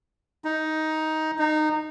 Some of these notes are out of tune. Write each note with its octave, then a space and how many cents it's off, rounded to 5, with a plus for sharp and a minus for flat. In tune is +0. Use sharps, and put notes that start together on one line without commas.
D#4 +10
D#4 -20